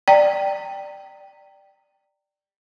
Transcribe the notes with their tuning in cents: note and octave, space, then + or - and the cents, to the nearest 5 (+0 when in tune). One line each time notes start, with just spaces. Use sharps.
D5 +10 G5 +0 A#5 -30